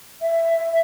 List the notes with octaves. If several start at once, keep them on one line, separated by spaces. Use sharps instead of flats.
E5